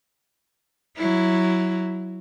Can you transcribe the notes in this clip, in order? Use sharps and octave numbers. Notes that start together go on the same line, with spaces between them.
F#3 E4